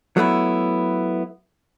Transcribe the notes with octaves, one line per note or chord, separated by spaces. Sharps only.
F#3 A3 B3 E4